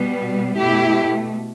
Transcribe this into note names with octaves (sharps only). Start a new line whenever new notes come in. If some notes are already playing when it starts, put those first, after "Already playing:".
Already playing: B2 G3 B3
B2 A3 E4 G4